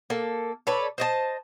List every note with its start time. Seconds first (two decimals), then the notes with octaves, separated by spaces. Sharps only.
0.10 A#3 A4
0.67 A4 B4 C#5 D5
0.98 C5 D#5 A5